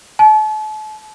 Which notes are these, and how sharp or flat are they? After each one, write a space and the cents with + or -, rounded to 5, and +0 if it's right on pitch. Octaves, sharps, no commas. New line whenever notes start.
A5 -40